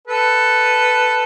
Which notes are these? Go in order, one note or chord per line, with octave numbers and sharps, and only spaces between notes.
A4 B4